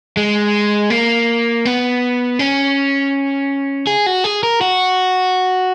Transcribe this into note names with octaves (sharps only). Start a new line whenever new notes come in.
G#3
A#3
B3
C#4
G#4
F#4
G#4
A#4
F#4